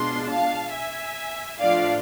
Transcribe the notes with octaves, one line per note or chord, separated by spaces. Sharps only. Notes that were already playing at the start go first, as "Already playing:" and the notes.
Already playing: B2 G#3 D4 F4 C6
F5 A5
E5 G#5
A2 F3 A3 D4 F4 D5 F5